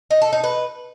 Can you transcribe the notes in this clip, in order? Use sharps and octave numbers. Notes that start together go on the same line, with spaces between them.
D#4
A4
D#4
B4